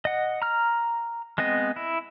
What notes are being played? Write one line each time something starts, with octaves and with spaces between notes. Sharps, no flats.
D#5 F#5
A#5 F6
G#3 B3 C4 D#5
E4